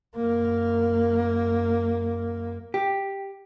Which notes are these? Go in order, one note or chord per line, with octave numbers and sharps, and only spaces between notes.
F#2 A#3
G4